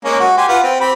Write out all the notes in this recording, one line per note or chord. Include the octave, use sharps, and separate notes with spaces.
G#3 A#3 C#4
F#4
G4 G#5 C6
F4 B4 F#5
C4 G5
C4 G4 B5